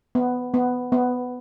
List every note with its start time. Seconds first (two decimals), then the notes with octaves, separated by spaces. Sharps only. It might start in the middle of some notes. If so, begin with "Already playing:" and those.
0.15 B3
0.54 B3
0.92 B3